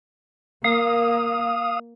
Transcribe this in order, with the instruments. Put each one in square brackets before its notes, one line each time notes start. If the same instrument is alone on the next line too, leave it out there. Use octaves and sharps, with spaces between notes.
[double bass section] A#3 [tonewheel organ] F5 D#6